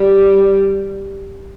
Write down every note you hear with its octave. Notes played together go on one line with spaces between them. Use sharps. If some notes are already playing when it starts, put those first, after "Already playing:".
Already playing: G3